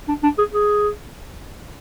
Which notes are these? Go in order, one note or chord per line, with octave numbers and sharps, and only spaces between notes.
D4
D4
G#4
G#4